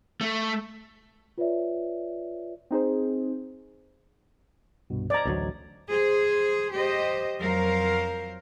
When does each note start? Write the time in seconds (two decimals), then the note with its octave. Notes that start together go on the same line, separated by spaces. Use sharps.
0.21 A3
1.38 F4 B4 C#5 D5 E5
2.71 C4 D#4 G#4 C5
4.90 C2 G2 B2
5.10 C5 D5 D#5 A#5 G#6
5.25 A1 D2 F#3
5.90 G#4 C5
6.75 G4 C5 D#5
7.41 F2 F#3 A#4 C5 F5